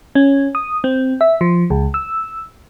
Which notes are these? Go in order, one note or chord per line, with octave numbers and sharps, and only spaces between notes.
C#4
D#6
C4
E5
F3
C#2
E6